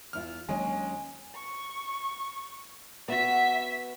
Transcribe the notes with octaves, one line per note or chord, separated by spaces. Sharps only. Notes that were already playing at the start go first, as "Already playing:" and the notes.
E2 E4 F4 F6
D#2 D#3 F#3 G#3 C#4 D4 D#5 G#5
C#6
B3 F#4 E5 B6